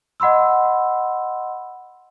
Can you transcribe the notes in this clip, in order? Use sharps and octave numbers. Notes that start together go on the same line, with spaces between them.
D#5 F#5 B5 C6 E6